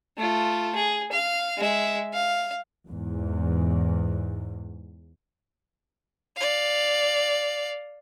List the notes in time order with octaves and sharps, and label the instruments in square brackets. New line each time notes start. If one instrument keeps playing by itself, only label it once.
[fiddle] A3 F4
G#4
F5
G#3 E5
F5
[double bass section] E2 G#2
[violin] D5 F5